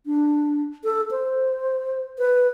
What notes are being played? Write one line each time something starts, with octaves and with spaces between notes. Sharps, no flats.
D4
A4
C5
B4